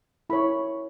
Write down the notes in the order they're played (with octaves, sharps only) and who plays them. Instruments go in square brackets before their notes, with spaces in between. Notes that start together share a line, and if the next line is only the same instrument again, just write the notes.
[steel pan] E4 A#4 C#5 B5